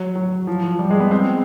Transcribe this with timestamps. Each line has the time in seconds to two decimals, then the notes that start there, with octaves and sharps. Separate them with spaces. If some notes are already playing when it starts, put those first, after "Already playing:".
Already playing: F#3
0.16 F#3
0.47 F3
0.63 F3
0.79 G3
0.90 G#3
1.00 B3
1.11 C4